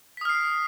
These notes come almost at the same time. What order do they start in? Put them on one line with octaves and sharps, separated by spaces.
B6 D#6 F6 C7